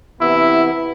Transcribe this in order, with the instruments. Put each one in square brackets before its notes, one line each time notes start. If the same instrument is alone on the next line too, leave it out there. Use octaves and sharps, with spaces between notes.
[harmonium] C3 E3 B3 [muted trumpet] E4